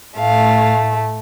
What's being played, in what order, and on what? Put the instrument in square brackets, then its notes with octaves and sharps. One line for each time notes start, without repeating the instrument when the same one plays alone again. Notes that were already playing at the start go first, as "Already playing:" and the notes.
[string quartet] A2 A3 F5